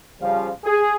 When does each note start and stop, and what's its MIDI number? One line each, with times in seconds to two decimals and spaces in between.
0.21 0.48 49
0.21 0.48 53
0.21 0.48 55
0.21 0.48 77
0.65 0.95 68